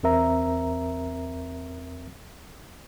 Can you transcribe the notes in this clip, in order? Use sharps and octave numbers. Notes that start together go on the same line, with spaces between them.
E2 C4 A#4 E5 A#5